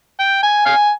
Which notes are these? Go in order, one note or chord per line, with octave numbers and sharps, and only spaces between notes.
G5
G#5
F5 G#5